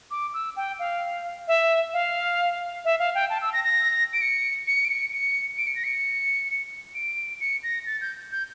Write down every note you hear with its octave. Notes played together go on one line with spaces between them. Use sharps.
D6
E6
G5
F5
E5
F5
E5
F5
G5
A5
E6
A#6
A#6
D7
C#7
C#7
D7
C#7
C#7
D7
C#7
A#6
C#7
D7
C#7
A#6
A6
G6
G6